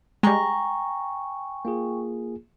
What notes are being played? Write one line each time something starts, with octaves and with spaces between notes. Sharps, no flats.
G3 G#3 G5 G#5 A#5 C#6
A#3 F4 G#4